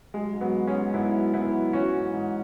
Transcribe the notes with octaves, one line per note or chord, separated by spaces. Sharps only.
F#3 G#3
G#2
F#3 B3
G#2
G#3 C#4
G#2
G#2 B3 E4
F#3
G#2 B3 E4
F#3
E3 C#4 F#4
G#2
G#2